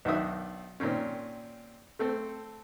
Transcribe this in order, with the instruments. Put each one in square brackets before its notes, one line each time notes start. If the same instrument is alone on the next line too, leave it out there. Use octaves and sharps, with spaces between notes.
[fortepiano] B1 D#3 D4 F#4 E5 D#6
A#2 D#3 C4 C#4
A3 C4 A4 C5